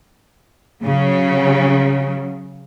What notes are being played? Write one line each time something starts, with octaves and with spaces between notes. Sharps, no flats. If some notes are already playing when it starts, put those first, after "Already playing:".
C#3 F#3